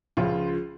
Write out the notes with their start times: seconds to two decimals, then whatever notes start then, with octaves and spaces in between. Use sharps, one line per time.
0.17 C#2 C#3 F3 F4